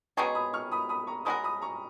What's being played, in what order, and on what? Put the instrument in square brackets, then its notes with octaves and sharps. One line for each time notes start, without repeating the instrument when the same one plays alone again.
[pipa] B2 G#3 C#4 G#4 [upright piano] A#5 C#6
[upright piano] B5 D#6
C#6 F6
B5 D#6
B5 D#6
A#5 C#6
[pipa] G#3 C#4 F#4 A#4 [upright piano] B5 D#6
[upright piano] B5 D#6
A#5 C#6